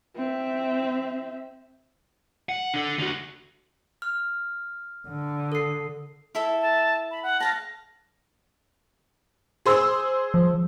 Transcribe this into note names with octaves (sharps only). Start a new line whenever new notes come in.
C4 E5
F#5
D4 A4
D3 F#4
F6
D3
A4 C7
E4 A4 E5
A5
B5
F#5
F5 G5 A5 A#6
G#4 C5 E6
F3